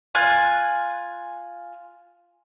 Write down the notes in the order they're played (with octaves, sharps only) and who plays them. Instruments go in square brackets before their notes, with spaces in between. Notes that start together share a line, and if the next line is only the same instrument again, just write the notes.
[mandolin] F4 G#5 F#6